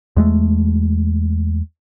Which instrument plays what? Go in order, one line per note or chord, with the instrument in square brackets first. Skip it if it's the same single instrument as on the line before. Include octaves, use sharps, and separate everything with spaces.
[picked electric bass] E2 G#3 A3